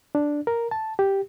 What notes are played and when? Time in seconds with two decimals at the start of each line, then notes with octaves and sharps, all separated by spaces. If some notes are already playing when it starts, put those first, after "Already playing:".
0.15 D4
0.47 A#4
0.71 A5
0.99 G4